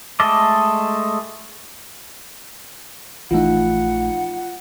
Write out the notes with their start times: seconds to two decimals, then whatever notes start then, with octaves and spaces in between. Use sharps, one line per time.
0.20 G#3 A3 A4 D#5 D6
3.31 A#1 E3 F3 A3 D#4 F4 F#5